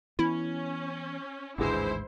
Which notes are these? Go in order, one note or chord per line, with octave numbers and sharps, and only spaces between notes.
E3 B3 C#4 E4
A1 D#2 G#2 D3 E3 G#3 E4 C5